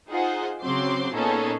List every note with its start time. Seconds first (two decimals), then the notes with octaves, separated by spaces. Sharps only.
0.10 D#4 F4 G#4 C5 F#5
0.61 C#3 F#3 C4 C6 D6 C7
1.14 A#2 B3 C#4 D#4 G#4 A4